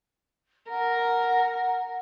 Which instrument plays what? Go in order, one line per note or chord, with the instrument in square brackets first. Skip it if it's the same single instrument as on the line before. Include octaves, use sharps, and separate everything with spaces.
[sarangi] A#4 [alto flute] F#5